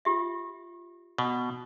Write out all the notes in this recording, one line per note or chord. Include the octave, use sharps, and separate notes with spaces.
F4 G4 E5
B2